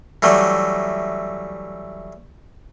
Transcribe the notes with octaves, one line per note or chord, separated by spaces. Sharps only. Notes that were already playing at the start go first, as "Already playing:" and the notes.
E3 F#3 G3 A3